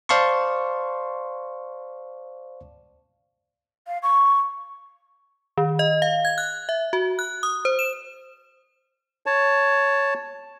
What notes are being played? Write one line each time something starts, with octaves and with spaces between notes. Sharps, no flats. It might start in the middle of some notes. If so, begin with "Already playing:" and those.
C5 D5 F5 A5 C6 C#6
F5
C#6
D#3
D#5
F5
G#6
F#6
E5
F#4
F#6
D#6
C5
E7
C#5 A5